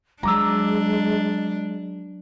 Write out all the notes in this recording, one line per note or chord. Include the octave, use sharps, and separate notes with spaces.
F#3 G#3 D4 A#5 D6 E6